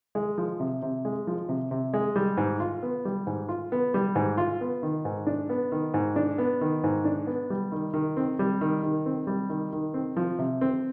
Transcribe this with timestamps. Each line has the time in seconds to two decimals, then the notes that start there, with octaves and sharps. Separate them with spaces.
0.15 G#3
0.38 F3
0.60 C3
0.82 C3
1.05 G#3
1.27 F3
1.49 C3
1.71 C3
1.93 G#3
2.16 G3
2.37 G#2
2.60 F4
2.83 B3
3.05 G3
3.27 G#2
3.49 F4
3.72 B3
3.94 G3
4.15 G#2
4.38 F4
4.61 B3
4.83 D#3
5.05 G#2
5.27 D4
5.49 B3
5.72 D#3
5.94 G#2
6.16 D4
6.38 B3
6.61 D#3
6.83 G#2
7.05 D4
7.27 B3
7.50 G3
7.72 D#3
7.94 D#3
8.17 C4
8.39 G3
8.61 D#3
8.83 D#3
9.06 C4
9.27 G3
9.50 D#3
9.73 D#3
9.94 C4
10.17 F3
10.39 C3
10.61 C4